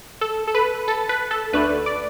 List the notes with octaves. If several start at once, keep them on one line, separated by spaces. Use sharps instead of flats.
A4
A4
B4
A4
B4
A4
D2 D3 A3 D4 B4
D5